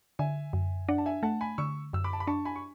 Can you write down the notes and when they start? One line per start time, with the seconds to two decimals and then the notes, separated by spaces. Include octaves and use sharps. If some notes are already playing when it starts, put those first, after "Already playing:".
0.19 D3 E5 G#5
0.53 F#2
0.88 D4 D5 F#5
0.98 A5
1.06 E5 G#5
1.23 A3 F#5 A5
1.41 G#5 B5
1.58 D3 C#6 E6
1.93 F#2 E6
2.04 B5 D6
2.13 A5
2.20 B5
2.27 D4 A5 C#6
2.45 G#5 B5
2.56 C#6